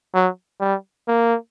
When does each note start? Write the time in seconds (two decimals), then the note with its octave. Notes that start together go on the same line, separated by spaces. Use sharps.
0.14 F#3
0.60 G3
1.08 A#3